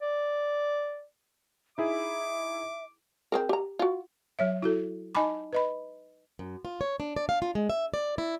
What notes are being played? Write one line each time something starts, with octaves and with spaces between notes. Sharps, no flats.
D5
D#4 E4 G#4 E5 D6
C4 G#4 A#4
G4 A#5
F4 F#4
F#3 C#5 E5
E4 F#4 A4
D#4 D#5 G#5 A5 B5 D6
B4 D#5 B5
F#2
F4
C#5
D4
D5
F5
F4
G#3
E5
D5
E4